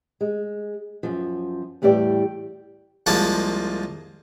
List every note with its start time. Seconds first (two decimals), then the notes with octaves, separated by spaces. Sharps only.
0.21 G#3
1.03 F#2 F3
1.82 E2 A2 G3 G4 D5
3.06 C2 F3 G#3 A#3 A5